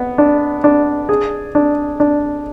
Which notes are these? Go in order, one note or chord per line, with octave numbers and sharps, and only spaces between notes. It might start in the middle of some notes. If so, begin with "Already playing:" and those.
Already playing: B3
D4
D4
G#4
D4
D4